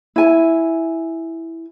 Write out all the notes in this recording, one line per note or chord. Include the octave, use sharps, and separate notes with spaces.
E4 G#5